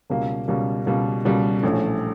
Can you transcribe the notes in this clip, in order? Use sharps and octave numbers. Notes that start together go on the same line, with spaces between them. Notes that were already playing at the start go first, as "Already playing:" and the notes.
C#2 B2 G3 A#3
C#2 B2 G3 A#3
C#2 B2 G3 A#3
C#2 B2 G3 A#3
A#1 A2 E3 A3 C#4